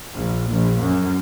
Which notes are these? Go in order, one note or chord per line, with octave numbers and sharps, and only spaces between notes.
A#1
A#1
F#2